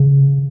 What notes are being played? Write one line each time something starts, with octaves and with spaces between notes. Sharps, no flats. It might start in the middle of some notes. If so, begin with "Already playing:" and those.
Already playing: C#3